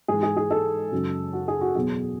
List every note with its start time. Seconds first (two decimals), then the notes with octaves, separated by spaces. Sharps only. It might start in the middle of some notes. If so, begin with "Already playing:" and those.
0.08 G#2 E3 G#4
0.23 G#4
0.37 G#4
0.51 A4
0.92 F#2 C#3 F#3
1.33 F#4
1.48 G#4
1.61 F#4
1.75 E2 B2 F#3 G#4